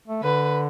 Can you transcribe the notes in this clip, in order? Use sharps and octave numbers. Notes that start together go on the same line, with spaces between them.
A3
D3 B4